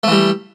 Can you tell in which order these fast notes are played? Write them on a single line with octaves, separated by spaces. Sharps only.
A3 E3 G3